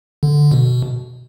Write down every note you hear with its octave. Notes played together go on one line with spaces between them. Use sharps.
D3
B2